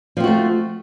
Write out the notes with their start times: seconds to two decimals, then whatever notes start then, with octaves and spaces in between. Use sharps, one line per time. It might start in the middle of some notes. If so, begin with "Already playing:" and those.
0.17 F3
0.20 C4
0.24 F#4
0.27 A3